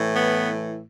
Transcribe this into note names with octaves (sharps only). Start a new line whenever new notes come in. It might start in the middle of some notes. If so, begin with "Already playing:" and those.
Already playing: A2 E3
B3